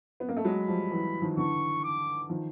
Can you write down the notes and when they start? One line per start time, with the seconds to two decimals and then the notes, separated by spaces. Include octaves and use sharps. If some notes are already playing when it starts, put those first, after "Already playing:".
0.20 B3
0.29 A#3
0.36 A3
0.45 F#3 G#3 B5
0.68 F3 G3
0.91 E3 F#3
1.22 D#3 F3
1.37 D3 E3 C#6
1.84 D6
2.29 D#3 F3